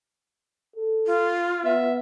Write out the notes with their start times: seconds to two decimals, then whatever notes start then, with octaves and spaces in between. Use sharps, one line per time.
0.76 A4
1.07 F4
1.65 B3 E5